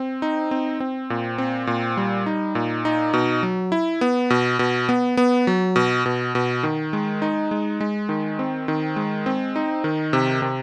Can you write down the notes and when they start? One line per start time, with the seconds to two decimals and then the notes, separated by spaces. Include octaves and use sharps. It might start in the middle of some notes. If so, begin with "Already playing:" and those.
Already playing: C4
0.22 D#4
0.51 C4
0.80 C4
1.10 A#2
1.38 C4
1.67 A#2
1.97 G3
2.26 D#4
2.55 A#2
2.85 D#4
3.14 B2
3.43 F#3
3.72 E4
4.01 B3
4.30 B2
4.59 B2
4.89 B3
5.17 B3
5.47 F#3
5.76 B2
6.06 B2
6.35 B2
6.63 D#3
6.93 G#3
7.22 D#4
7.51 G#3
7.80 G#3
8.09 D#3
8.39 C4
8.68 D#3
8.96 G#3
9.26 C4
9.56 D#4
9.84 D#3
10.13 C3
10.42 C3